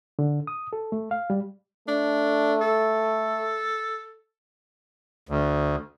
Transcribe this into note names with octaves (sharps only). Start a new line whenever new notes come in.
D3
D#6
A4
A3
F5
G3
A3 D4
A4
D2